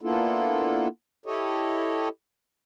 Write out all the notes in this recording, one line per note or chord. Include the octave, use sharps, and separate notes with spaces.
A#3 B3 D4 E4 F4 A4
E4 G4 A4 C#5 D#5